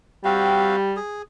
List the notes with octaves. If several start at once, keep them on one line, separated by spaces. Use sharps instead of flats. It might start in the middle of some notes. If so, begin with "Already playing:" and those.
G3 C4 F#4 F5
G#4